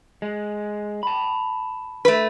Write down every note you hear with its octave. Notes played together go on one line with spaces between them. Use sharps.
G#3
A5 B5
A3 B4